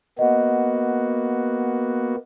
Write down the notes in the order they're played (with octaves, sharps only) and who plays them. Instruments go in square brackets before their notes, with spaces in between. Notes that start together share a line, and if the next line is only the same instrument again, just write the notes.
[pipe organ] A#3 B3 F#4 [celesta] D#5 F#5